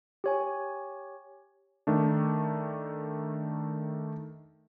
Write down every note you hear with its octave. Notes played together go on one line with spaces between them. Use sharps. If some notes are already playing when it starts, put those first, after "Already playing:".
G4 C#5 G#5
D#3 A3 D4